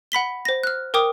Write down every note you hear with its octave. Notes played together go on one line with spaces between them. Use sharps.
F#5 B5 B6 G7
C5 A#6
F6 F#6
A#4 G5 D6 D#6